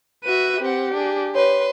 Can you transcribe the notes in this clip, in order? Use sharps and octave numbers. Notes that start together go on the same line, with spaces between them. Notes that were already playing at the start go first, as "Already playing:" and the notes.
F#4 B4 E5 D#7
C4 G4 F#5
D4 G#4
B4 C#5 C6